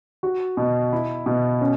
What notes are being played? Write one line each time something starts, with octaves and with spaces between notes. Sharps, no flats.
F#4
B2
E4
B2
C#4